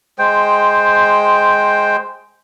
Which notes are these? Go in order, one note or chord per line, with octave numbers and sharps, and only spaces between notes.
G#3 C5 G5